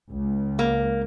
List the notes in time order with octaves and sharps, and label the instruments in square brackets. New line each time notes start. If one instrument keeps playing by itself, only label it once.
[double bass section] C#2
[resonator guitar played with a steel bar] A#3